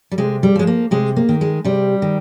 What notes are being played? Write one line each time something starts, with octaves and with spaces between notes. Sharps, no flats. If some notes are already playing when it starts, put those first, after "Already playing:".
G3
C3 G#3
G3
F3 G#3
A#3
C3 G#3
A#3
D#3
G#3
C3 G3
D#3